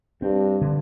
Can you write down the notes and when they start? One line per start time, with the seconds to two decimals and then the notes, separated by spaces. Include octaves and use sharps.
0.22 G2 C4
0.61 D3